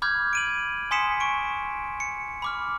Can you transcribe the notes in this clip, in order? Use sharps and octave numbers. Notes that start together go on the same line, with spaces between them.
B5 D6 F6 G6 G#6
D7 D#7 F#7
G#5 C6 D#6 B6 C#7 E7
C#6 D7
C#7
B5 D6 F6